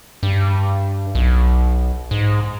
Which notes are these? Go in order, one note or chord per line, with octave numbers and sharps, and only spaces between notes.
G2
B1
G#2